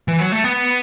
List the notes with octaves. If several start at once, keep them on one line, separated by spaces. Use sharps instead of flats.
E3
F#3
A3
B3